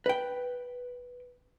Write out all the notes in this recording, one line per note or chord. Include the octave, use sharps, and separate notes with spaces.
B4 G5